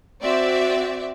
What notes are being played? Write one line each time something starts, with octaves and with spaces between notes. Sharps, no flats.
C4 F#4 D5 E5